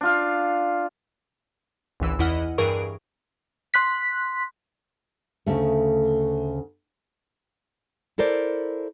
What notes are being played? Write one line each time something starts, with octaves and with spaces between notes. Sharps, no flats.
D4 F4 F5
G#1 C#2 E3 E6
E2 E3 E4 D#5 F#5 F6
G2 E3 G#4 A#4 C#6 D7
C6 F#6 B6
D2 C#3 A3
E4 A4 A#4 C5 D5